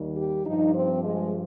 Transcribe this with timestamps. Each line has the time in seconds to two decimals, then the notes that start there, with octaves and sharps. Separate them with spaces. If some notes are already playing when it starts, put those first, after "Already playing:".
Already playing: D#2 D#3 G3
0.17 G4
0.46 G2 F3 D#4
0.75 C4
1.04 G#3